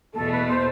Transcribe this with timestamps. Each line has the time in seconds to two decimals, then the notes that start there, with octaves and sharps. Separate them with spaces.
0.14 E2 B2 A3 A4
0.31 B4
0.48 C5